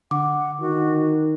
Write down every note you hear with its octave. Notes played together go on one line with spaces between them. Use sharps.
D3 F#5 D6
D#3 F#4